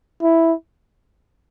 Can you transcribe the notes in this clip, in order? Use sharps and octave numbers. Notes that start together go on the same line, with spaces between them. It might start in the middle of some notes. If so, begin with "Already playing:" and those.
E4